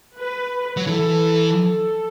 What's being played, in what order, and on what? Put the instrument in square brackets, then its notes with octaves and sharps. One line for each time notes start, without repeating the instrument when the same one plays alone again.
[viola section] B4
[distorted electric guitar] F#3
[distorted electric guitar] E3 [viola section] A4
[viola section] A4